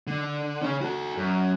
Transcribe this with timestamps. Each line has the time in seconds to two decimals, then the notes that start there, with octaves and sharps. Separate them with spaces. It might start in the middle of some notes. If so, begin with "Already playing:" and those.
0.07 D3
0.61 C#3 C#4
0.81 F#4 A4
1.17 F#2